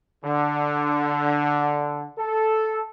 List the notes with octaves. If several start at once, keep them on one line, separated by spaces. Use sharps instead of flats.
D3
A4